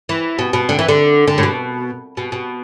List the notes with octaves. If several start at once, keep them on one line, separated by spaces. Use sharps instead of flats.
E3
B2
B2
D3
E3
D3
D3
A2
B2
B2
B2